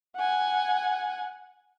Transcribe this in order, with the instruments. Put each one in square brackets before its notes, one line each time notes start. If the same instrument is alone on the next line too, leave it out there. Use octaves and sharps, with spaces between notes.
[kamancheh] F#5 G#5